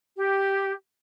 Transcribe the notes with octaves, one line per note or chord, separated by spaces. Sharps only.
G4